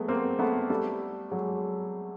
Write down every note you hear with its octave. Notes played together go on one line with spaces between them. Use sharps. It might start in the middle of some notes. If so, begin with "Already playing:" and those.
Already playing: F#3 G#3 A3 B3
A#3 C4
A3 B3
G3 A3
F#3 G#3